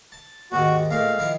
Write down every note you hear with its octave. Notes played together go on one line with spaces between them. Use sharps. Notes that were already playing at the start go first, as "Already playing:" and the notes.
A5
D#2 G#2 D#3 F#4
A#2 G#3 A3 F5
D#3 F3 E4